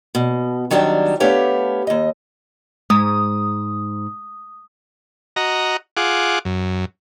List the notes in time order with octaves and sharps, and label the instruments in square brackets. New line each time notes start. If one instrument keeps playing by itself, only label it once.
[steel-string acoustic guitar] B2
D#3 F#3 G3 C4 D4
A3 B3 D4 G4 C#5 F5
D#2 D#5
[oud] G#2 [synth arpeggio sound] G#3 [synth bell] D#6
[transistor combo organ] F#4 D#5 A#5
F4 G#4 F#5 D6
F#2